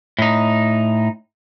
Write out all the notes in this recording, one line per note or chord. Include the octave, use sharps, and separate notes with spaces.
A2 D#4